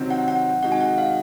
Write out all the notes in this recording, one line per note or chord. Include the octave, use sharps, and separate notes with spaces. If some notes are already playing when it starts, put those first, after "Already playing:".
Already playing: C3 D#3 F#3 C4
F#5
F#5
C3 D#3 G#3 D#4 F#4 F#5
G#5
F#5
F5